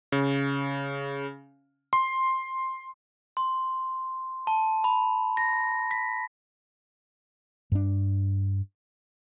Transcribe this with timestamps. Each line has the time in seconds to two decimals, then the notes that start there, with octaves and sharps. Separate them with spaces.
0.12 C#3
1.93 C6
3.37 C6
4.47 A5
4.84 B5
5.37 A#6
5.91 B6
7.72 G2 D4